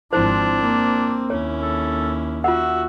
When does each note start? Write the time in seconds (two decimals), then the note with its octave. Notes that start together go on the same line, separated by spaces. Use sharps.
0.13 G#1 F3 C4 D4 E4 C5
0.61 A#3
1.30 D#2 C#4 E4 C#5
1.62 A4
2.44 F4 F#4 E5 F#5